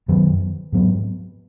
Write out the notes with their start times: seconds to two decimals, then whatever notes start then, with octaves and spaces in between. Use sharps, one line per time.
0.08 F#2 D#3 F#3 B3
0.72 G#2 F#3 B3